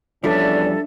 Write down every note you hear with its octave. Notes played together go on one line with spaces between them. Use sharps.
E2 F3 G3 C#4 D4 A4 D5 E5